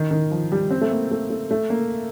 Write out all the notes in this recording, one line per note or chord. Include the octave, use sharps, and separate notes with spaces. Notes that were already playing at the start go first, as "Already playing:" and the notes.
Already playing: D#3
D#3
F3
G3
C4
A3
A#3
A3
A3
A3
A#3